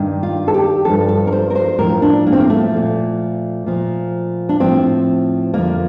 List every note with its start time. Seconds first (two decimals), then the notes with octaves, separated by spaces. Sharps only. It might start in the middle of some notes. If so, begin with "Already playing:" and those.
Already playing: G2 D#3
0.23 F4
0.48 A4
0.54 G4
0.85 G2 F3 A4
1.09 A4
1.27 A#4
1.33 C5
1.50 A#4
1.55 C5
1.79 A2 F3 A#4
2.02 D4
2.26 A#3
2.33 C4
2.40 A#3
2.50 A3
2.72 A#2 F3
3.66 A#2 F3
4.49 D4
4.60 A2 F3 C4
5.54 F2 D3 F3 A#3